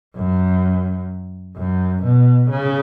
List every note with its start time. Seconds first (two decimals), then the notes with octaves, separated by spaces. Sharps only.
0.17 F#2
1.56 F#2
2.03 B2
2.50 C#3